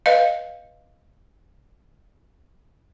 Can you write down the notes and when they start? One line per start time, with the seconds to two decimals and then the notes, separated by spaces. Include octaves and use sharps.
0.06 B4 D#5 F5